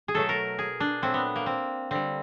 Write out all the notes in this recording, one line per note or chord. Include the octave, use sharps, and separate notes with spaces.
G#4
B2 F#3 A3 A4
A#4
G#4
D4
A#2 F#3 A3 C4
B3
A#3
C4
D3 G3 C4